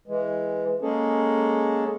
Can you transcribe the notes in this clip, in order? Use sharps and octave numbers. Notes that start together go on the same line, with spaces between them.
E3 G#3
G#3 A#3 C#4 G#4 A4